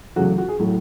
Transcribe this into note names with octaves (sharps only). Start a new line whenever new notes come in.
E2 C#3 F#3 A3 F#4
F#4
G#4
A2 F#3 A3